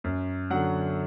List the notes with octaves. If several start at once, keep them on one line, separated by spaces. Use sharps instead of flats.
F#2
D3 F#3 F#5